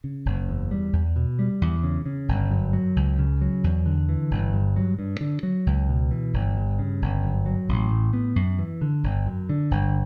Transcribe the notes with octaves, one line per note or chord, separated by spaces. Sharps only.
C#3
F#1
E2
G3
E2
B2
G3
E2
C#3
C#3
G1
F#2
F#3
C#2
C#3
F#3
E2
D3
E3
G1
G2
F#3
G2
D3
F#3
C#2
B2
E3
G1
G2
C#3
G1
F#2
F#3
A1
A2
B3
F#2
E3
D3
G1
F#2
D3
G1